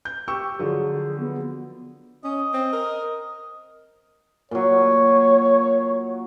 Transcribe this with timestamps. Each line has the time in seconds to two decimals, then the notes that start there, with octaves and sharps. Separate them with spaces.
0.05 G6
0.28 G4 C#6 E6
0.59 D3 F3 F#3 G#4
1.19 B3
2.24 C#4 D#5
2.53 C4
2.73 A#4
4.51 A#2 F#3 C#5